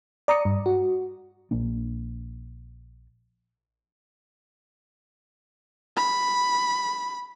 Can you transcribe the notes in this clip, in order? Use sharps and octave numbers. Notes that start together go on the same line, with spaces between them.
D5 A#5 D#6 C#7
G2
F#4
A#1 A#3 D4
B5